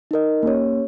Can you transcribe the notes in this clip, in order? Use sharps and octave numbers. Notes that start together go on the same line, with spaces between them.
D#4 A#4 D#5
A#3 C#4 G4 C#5